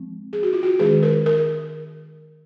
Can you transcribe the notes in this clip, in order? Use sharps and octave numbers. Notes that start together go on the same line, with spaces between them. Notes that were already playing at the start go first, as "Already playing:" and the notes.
Already playing: F3 G#3 C4
G#4
F#4
F4
F#4
D#3 G#3 C#4 G#4
A#4
A#4